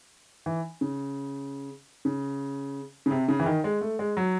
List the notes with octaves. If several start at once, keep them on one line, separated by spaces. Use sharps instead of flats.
E3
C#3
C#3
C#3
C3
C#3
E3
D#3
G#3
A3
G#3
F#3